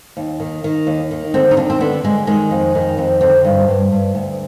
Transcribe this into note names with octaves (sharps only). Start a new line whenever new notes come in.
D#2
D#3
D#3
D#2
D#3
D3 C4
D#4
D#2 D4
C4
D3 B3
D3 G#3
D#3 G#3
F2
D#3
F2
D3 C4
G2
G2
G2
D2